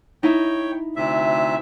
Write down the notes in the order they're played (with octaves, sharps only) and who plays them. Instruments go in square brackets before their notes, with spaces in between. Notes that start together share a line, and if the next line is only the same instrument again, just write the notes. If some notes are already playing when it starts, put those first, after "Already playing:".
[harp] D#4 E4 [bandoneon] C#5 G5
[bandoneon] D2 C3 E5